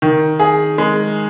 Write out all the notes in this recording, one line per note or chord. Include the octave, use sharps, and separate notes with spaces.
D#3
G#4
G#3